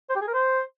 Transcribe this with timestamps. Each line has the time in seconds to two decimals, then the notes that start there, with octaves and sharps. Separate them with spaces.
0.10 C5
0.16 G4
0.22 G#4
0.28 A#4
0.33 C5